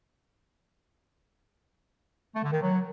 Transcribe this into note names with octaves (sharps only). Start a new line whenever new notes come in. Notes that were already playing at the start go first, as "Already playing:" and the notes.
A3
D3
D#3
F#3